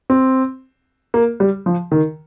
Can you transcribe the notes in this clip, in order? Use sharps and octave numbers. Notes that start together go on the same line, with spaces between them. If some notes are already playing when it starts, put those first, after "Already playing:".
C4
A#3
G3
F3
D#3